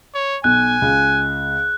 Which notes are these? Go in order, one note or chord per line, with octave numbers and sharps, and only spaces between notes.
C#5
B1 G#5 F#6
C#2